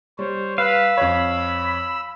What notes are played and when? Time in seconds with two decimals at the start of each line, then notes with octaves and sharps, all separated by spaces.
0.19 G3 C5 C#5
0.58 B4 F5 E6
0.97 F2 C#5 B5